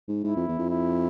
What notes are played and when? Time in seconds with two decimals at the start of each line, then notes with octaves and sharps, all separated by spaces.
0.08 G#2
0.24 G#2 E4
0.36 F2
0.48 E2
0.58 F2
0.70 E4